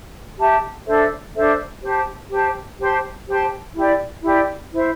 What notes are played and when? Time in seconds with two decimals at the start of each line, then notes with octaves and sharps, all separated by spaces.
0.38 G4 E5 A5
0.86 D4 A4 C5 E5
1.34 D4 A4 C5 E5
1.82 G4 C5 A5
2.30 G4 C5 A5
2.78 G4 C5 A5 C6
3.26 G4 C5 A5 C6
3.74 E4 G4 D5 G5
4.22 E4 G4 D5 G5
4.71 E4 C5 E5